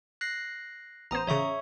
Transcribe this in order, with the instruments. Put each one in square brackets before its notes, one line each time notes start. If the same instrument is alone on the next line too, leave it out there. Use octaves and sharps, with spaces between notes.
[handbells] F#6 A#6 C7
[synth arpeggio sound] A1 B3 C5 [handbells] A#5 D#6
[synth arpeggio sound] A1 C#3 [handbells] C#5 E5 C#6